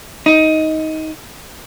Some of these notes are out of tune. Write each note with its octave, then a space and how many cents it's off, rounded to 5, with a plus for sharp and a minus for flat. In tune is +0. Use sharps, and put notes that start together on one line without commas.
D#4 +15